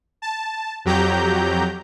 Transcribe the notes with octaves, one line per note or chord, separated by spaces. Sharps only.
A5
F2 F#3 G4 A#5 G6